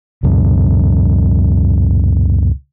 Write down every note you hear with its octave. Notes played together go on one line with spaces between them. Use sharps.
C#2 F#2 B2